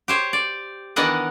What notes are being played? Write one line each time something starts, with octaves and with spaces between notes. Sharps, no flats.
G4 C5 C#5
D5
D#3 E3 B3 D4 D#5 F#5